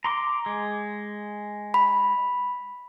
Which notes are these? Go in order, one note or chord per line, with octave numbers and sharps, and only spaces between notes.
A#5 C6 D6
G#3
B5